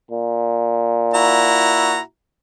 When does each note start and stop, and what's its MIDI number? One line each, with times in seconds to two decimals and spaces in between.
0.11 1.98 46
1.14 2.00 64
1.14 2.00 66
1.14 2.00 82